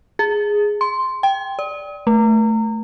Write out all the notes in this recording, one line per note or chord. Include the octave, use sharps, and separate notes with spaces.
G#4
C6
G5
D5
A3